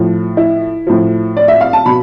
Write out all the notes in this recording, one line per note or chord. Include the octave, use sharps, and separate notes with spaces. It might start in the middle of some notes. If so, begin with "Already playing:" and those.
Already playing: A2 F3
E4
A2 F3
D5
E5
F5
A5
B2 B5